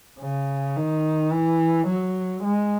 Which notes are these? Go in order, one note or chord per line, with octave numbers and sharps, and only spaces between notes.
C#3
D#3
E3
F#3
G#3